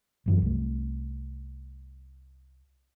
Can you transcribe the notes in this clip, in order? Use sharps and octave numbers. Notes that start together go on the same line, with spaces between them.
G1 F#2 E3
C2 A3